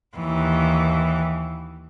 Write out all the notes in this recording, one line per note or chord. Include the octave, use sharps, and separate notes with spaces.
D#2 E3